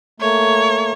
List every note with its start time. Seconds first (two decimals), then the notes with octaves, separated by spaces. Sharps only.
0.20 A3 A#3 C#5